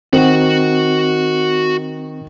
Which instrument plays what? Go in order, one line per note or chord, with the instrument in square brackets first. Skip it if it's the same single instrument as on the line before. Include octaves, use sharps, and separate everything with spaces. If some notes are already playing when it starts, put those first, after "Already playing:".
[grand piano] D#3 [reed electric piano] C4 [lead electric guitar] F#4 F#5